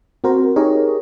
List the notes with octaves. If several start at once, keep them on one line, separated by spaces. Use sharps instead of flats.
C4 F#4 A#4 C5
D#4 G4 G#4 A#4 C#5 D#5